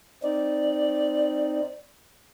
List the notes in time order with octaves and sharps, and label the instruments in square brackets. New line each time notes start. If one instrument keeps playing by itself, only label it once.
[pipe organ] C4 D#4 [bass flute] D5